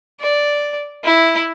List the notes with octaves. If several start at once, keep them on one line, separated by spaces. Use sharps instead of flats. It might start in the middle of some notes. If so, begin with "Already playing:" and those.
D5
E4